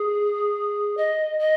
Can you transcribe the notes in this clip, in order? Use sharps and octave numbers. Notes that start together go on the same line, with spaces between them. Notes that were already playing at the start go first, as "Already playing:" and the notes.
Already playing: G#4
D#5
D#5